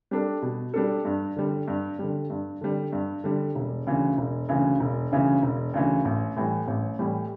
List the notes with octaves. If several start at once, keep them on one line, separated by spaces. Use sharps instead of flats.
G3 D4 A4
B2
G3 D4 A4
G2
D3 G3
G2
D3 G3
G2
D3 G3
G2
D3 G3
E1
D2 C#3 E3
E1
D2 C#3 E3
E1
D2 C#3 E3
E1
D2 C#3 E3
A1
A2 E3 G3
A1
A2 E3 G3